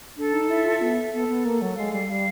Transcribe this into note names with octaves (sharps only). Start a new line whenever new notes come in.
D4 A4
D#4
E4 E5
F4
B3 A4
B3 A4
B3
A#3 A4
F#3
G#3 F5
G3
G3 F5